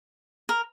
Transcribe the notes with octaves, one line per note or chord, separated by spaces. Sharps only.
A#4